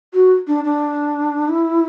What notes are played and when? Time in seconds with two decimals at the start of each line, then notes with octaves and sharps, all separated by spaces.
0.14 F#4
0.47 D4
0.64 D4
1.48 E4